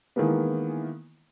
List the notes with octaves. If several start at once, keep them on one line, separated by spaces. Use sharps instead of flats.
D#3 E3 G#3 A#3 B3